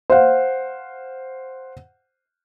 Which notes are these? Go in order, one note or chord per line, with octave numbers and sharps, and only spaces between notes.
C5 F5 F#5